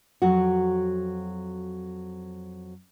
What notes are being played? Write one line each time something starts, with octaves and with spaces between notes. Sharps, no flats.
F2 F#3 F#4